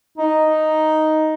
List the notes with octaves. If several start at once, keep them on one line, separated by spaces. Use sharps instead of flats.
D#4